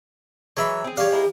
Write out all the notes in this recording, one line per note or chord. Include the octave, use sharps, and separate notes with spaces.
E3 F#3 G#3 C#5 E5 B5
C4 G#4
C#3 G3 G4 C#5 D5 F5
G#3 E4 A#4